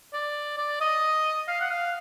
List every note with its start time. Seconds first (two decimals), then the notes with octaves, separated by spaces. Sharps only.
0.13 D5
0.57 D5
0.81 D#5
1.48 F5
1.60 F#5
1.71 F5